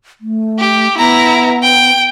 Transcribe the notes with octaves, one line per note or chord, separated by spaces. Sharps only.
A3
G4
B3 E4 A#5
G5